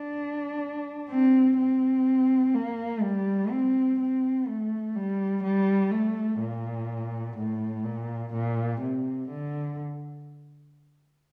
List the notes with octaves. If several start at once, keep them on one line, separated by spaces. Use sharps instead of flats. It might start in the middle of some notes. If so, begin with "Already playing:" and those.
Already playing: D4
C4
C4
A#3
G3
C4
C4
A3
G3
G3
A3
A#2
A2
A#2
A#2
C3
D3